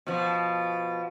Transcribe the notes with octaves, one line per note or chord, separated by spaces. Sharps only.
B2 F3